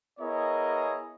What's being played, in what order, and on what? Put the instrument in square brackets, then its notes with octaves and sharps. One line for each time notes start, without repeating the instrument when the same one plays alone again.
[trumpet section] B3 E4 G#4 A#4 C#5 D#5